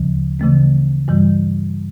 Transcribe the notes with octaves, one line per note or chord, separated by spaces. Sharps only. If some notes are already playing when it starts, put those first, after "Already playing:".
Already playing: D2 C#3 F3
C#3 E3 A3 C4
G2 E3 G3